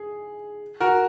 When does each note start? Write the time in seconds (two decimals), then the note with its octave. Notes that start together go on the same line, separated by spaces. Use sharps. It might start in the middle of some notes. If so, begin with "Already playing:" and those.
Already playing: G#4
0.80 F#4 A#4